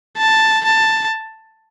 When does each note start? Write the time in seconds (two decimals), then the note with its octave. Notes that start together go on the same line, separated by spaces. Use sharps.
0.17 A5
0.65 A5